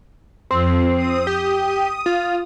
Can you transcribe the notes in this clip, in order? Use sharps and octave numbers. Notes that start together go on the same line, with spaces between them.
F2 C4
D#6
G4
F4